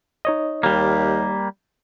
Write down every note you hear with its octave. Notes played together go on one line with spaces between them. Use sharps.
D#4 C#5 D#5
D#2 G3 A#3